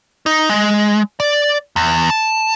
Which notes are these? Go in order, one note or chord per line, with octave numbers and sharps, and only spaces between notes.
D#4
G#3
D5
E2
A5